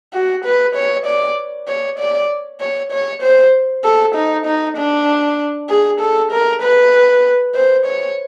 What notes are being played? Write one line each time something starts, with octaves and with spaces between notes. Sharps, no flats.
F#4
B4
C#5
D5
C#5
D5
C#5
C#5
C5
A4
D#4
D#4
D4
G#4
A4
A#4
B4
C5
C#5